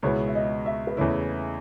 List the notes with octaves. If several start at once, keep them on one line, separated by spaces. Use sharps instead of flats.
C#2 B2 G#3 B3 E4 C#5
E5
D#5
E5
B4
E2 C#3 E3 A3 E4 C#5